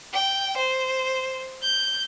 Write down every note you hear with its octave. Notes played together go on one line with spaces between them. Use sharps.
G5
C5
G6